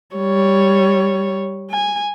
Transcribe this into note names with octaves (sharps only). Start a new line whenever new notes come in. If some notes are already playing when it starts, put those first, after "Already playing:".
G3 C#5
G#5